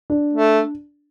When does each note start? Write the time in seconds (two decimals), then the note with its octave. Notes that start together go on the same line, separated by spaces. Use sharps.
0.10 D4
0.33 A3